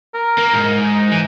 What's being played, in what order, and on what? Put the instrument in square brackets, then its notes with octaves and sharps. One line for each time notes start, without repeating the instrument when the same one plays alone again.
[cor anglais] A#4
[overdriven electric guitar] A#3
G#2
[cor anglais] D#4
[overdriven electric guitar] E3